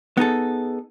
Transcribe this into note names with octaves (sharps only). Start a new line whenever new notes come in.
B3 D#4 G#4 A4